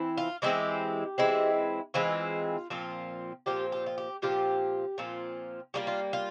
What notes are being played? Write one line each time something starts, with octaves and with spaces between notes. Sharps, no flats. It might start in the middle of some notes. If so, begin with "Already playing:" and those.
Already playing: E3 C4 E4
F4
E3 G#3 C4 E4 G4
E3 G#3 C4 E4
E3 G#3 C4 E4 F4
A#2 F3 C4 F4
A#2 F3 C4 F4 G4
G4
F4
G4
A#2 F3 C4 F4 G4
A#2 F3 C4 F4
G3 A#3 F4 G4
F4
F4